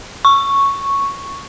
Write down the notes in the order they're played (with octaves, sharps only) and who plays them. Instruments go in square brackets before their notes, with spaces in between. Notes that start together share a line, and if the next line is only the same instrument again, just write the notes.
[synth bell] C#6